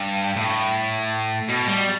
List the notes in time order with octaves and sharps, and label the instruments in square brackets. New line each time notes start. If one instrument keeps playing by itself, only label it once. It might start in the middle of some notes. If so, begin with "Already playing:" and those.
Already playing: [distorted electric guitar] G2
A2
B2
G3